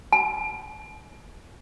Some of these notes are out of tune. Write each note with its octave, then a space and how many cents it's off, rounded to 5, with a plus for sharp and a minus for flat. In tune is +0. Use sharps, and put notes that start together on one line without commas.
A5 -45